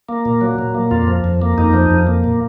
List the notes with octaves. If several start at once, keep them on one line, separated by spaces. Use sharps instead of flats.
A#3
A#2
F#3
A#2
A#3
F2 F4
F3
F2
A#3
F2 D#4
F3
F2
A#3
A#2